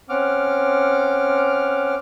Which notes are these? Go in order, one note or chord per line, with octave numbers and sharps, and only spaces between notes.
C4 C#4 F#5 D6 F6